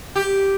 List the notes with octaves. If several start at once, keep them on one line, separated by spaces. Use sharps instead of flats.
G4